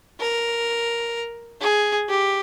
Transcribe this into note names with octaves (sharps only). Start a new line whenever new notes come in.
A#4
G#4
G4